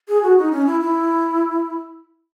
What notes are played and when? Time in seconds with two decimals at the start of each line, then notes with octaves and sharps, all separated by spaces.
0.08 G#4
0.23 F#4
0.38 D#4
0.52 C#4
0.66 E4
0.80 E4